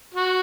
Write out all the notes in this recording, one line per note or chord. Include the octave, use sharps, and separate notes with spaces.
F#4